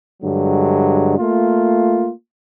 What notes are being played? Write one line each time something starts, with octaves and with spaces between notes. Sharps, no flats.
G2 D3 F#3 G#3
A3 A#3 F4